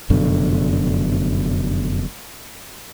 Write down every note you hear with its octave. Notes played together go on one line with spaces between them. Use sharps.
F1 F#2 B2 D3